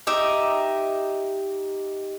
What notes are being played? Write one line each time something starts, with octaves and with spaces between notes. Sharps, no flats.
D#4 G4 E5